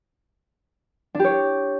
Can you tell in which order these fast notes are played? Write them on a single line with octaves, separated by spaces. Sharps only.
D4 G4 C#5